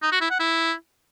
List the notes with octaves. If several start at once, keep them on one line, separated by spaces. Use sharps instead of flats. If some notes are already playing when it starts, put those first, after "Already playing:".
D#4
F#4
E4
F#5
E4